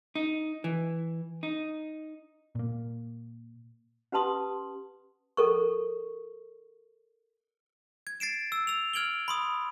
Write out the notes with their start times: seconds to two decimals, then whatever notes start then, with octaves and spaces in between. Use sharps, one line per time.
0.15 D#4
0.64 E3
1.43 D#4
2.55 A#2 A#3
4.12 C#4 G4 B4 A5 C6 D#6
5.37 A4 A#4 C#6
8.07 G#6
8.20 A6 C7 D7 E7
8.52 E6
8.67 E6 F7
8.93 F6 G#6 D7 F#7 G7
9.28 B5 C6 D#6